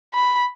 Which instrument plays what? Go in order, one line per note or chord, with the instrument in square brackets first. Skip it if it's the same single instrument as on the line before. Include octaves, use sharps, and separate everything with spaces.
[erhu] B5